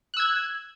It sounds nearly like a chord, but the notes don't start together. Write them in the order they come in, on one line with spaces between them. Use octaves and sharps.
F#6 E6 G#6